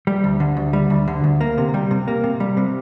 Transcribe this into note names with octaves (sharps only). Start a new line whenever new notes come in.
G3
D2
D3
D2
G3
D2
D3
D2
A#3
C3
G3
C3
A#3
C3
G3
C3